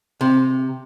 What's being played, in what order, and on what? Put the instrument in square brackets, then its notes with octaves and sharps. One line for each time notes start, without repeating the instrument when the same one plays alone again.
[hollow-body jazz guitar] C3